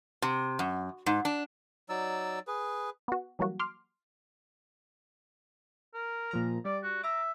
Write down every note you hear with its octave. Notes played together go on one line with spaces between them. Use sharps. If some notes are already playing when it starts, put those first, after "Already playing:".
C3
F#2
G#2
D4
F#3 D#4 D5 E6
G#4 B4
B3 F#4
E3 F#3 G3 A#3 F#4
C6 D6 F6
A#4
A#2 F3 A#5
G3 D5
F#4
E5 A#5 D6